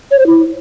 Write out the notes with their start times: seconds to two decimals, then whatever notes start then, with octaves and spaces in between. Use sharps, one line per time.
0.11 C#5
0.19 C5
0.26 E4